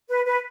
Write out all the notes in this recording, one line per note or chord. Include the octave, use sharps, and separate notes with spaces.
B4
B4